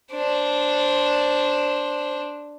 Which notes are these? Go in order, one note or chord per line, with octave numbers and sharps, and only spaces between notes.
D4 C5